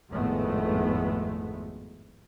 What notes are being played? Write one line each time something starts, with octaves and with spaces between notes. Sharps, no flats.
G#1 F2 A2 G#3 A3 B3